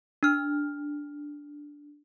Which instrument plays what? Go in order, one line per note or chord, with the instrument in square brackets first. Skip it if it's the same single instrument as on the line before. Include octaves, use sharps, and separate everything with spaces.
[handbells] D4 F6